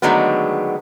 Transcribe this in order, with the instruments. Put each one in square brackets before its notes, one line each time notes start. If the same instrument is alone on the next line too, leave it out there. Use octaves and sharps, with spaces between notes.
[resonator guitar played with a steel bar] D3 D#3 F#3 G#3 A3 B3